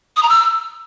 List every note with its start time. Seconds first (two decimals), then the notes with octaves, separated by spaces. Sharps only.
0.16 D#6
0.23 A#5
0.29 E6